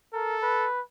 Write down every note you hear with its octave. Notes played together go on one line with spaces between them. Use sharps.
A4 A#4
B4